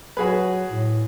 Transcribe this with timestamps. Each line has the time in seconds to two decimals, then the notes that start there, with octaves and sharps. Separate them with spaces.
0.17 F#3 F#4 G#4 B4
0.70 A2